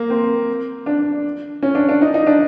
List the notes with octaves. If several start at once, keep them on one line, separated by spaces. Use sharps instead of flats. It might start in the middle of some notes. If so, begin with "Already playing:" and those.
Already playing: A#3
C4
D4
C#4
D4
D4
D#4
D#4
D4